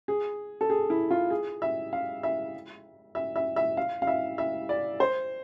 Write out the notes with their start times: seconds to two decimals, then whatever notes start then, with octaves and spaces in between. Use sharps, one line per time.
0.08 G#4
0.61 A4
0.70 G#4
0.90 E4
1.11 F4
1.30 G#4
1.62 E5
1.93 F5
2.23 E5
3.15 E5
3.36 E5
3.56 E5
3.77 F5
4.02 F5
4.07 E5
4.38 E5
4.69 D5
5.00 C5